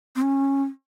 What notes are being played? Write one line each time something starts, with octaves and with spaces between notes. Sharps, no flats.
C4
C#4